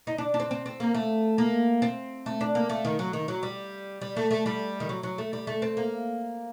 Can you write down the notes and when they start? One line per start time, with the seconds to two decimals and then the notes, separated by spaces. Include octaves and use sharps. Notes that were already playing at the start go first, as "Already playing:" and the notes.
0.07 D#4
0.18 D4
0.34 D4
0.40 C4
0.51 C4
0.66 C4
0.80 A#3
0.94 A3
1.38 A#3
1.82 C4
2.26 A3
2.41 D4
2.55 A#3
2.69 A3
2.85 D#3
2.99 F#3
3.13 D#3
3.28 F#3
3.43 G3
4.01 G3
4.16 A3
4.31 A3
4.46 G3
4.80 D#3
4.89 F#3
5.03 F#3
5.18 A3
5.33 G3
5.47 A3
5.62 C4
5.77 A#3